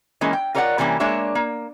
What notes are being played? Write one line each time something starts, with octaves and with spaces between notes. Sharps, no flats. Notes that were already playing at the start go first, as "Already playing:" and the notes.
E3 G#3 A#3 C#4
G5
F4 A#4 C#5 D5 F5 F#5
C3 E3 G3 A#3 C#4
G#3 A#3 D4 C#5 E5
A#3